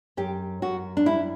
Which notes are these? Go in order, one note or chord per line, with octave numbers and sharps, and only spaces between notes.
F#2 G4
F#2 F#4
D4
G3 E4